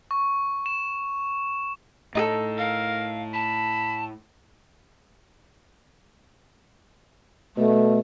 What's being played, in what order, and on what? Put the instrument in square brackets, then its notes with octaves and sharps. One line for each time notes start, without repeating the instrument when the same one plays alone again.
[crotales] C#6
E7
[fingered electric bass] A2 [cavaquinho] D#4 G#4 A4
[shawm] A#4 [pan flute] F5
[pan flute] A5 [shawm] B5
[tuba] B2 [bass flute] A3